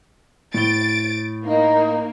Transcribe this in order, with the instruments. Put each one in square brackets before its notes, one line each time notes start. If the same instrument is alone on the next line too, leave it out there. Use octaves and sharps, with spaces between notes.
[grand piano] A2 G7 [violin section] A6 D7
[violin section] A#3 [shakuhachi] D#4